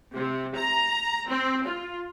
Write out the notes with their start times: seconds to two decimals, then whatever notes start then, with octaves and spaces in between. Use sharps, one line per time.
0.13 C3
0.55 A#5
1.27 C4
1.65 F4